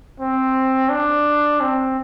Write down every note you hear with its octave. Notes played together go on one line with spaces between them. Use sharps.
C4
D4
C4